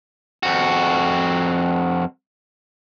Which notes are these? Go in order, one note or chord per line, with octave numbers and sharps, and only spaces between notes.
F2 F#4